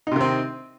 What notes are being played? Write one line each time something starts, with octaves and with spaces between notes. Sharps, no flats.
C3 D#3 C4 D#4